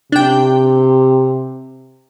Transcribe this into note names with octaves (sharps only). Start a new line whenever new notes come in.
C3 D4 G5